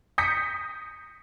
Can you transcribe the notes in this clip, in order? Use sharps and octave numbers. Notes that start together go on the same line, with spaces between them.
D#6 G6 A#6 B6 C#7